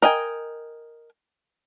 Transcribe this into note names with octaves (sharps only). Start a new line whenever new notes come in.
A#4 D#5 G5 G#5